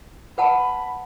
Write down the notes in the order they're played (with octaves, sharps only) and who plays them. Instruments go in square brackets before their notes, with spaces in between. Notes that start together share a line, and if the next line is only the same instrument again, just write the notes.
[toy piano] B4 F#5 A5 [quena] B5